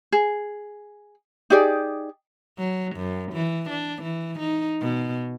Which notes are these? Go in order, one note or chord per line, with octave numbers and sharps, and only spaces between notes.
G#4
D#4 G4 G#4 D5
F#3
F#2
E3
D4
E3
D#4
B2